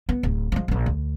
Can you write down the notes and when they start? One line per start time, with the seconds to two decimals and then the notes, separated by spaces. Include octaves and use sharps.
0.09 B3
0.23 D1
0.52 F3 G#3
0.68 D1 A#1
0.86 D2